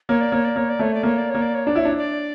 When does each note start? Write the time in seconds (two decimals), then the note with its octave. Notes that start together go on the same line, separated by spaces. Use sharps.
0.09 A#3 C#5
0.21 D5
0.32 A#3 C#5
0.45 D5
0.56 A#3 C#5
0.70 D5
0.79 A3 C#5
0.94 D5
1.03 A#3 C#5
1.18 D5
1.30 A#3 C#5
1.42 D5
1.55 C#5
1.67 D4 D5
1.75 E4 C#5
1.85 D4
1.97 D5